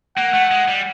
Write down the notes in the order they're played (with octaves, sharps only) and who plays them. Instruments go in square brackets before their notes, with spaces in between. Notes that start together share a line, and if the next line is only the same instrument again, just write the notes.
[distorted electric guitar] A#3 [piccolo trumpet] F#5
[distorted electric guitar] A3
G#3
G3